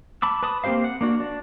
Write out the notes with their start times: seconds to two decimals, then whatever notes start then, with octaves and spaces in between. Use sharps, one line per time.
0.22 A5 B5 D6 E6
0.43 B4 A5 B5 D#6
0.64 A#3 C4 G4 C5 F5
0.84 F#5
1.01 A#3 D4 F#4
1.20 D4